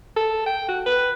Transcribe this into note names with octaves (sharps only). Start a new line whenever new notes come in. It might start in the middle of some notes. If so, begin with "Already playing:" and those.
A4
G5
F#4
B4